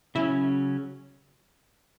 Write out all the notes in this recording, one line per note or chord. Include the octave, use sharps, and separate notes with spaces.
C#3 F#3 C#4 E4